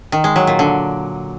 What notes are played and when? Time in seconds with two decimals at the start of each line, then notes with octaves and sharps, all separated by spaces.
0.12 D#3
0.24 G#3
0.36 F#3
0.47 A#2
0.59 D3